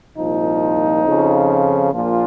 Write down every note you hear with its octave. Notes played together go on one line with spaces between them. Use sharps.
C2 A#2 F3 D#4
F2 C#3 F3
A#1 A#2 F3 F4